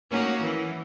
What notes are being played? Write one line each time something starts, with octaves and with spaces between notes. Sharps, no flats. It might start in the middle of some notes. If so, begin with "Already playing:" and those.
A#3 C#4 D#4 F#4
E3